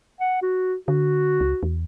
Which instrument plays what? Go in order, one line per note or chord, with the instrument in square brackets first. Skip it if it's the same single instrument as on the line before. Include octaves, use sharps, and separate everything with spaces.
[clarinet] F#5
F#4
[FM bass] D3 [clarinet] F#4
[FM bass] C#2
E2